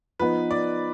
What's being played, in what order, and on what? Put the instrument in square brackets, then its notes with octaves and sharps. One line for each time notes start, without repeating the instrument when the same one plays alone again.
[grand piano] F3 B3 D#4 [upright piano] B4
[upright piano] D5